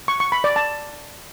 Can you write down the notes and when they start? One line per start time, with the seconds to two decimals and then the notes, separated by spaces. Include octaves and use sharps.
0.08 C#6
0.20 C#6
0.32 B5
0.44 D5
0.56 A5